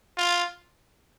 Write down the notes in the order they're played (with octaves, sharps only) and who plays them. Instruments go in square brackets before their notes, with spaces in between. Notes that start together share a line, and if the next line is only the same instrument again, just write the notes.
[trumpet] F4